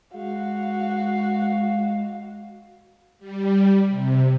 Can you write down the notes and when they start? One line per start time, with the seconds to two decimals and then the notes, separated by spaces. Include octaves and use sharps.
0.14 G#3 F#4 F5
3.19 G3
3.88 C3